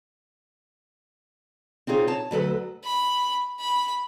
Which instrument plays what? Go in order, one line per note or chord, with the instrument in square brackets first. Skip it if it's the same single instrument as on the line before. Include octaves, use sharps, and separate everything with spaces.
[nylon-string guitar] C4 D#4 F4 G#4 C#5
C#5 A5
D2 F#3 A4 B4
[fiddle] B5
B5